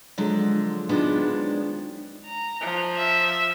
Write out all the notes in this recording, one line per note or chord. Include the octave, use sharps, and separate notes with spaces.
D3 F3 F#3 G#3
D#3 F3 F#3 G#3 B3 D4
A#5
F3
E5